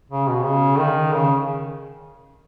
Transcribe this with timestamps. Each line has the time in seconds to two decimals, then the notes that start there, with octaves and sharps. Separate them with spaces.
0.11 C#3
0.28 B2
0.45 C#3
0.80 D#3
1.15 C#3